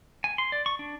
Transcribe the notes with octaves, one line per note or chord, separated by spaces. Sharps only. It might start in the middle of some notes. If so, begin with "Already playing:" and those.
G#5
C6
D5
C#6
D4